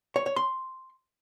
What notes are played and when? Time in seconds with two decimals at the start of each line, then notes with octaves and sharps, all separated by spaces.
0.16 C#5
0.26 C#5
0.36 C6